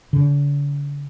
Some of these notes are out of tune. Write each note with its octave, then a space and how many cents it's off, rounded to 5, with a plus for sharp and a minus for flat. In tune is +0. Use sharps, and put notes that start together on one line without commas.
D3 -45